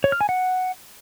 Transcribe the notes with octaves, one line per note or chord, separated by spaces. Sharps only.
C#5
F6
G#5
F#5